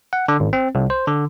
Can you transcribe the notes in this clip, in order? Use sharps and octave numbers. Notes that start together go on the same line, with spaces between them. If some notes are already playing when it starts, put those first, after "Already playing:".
F#5
D3
G#1
C4
C2
C5
D3